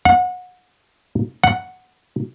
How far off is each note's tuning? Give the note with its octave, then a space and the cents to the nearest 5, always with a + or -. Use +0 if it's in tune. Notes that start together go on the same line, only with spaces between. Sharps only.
F#5 -25
F#5 +0